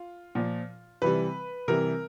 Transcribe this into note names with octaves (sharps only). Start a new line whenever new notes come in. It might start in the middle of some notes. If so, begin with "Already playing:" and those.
Already playing: F4
A#2 F3
C3 E3 G3 B4
C3 E3 G3 A#4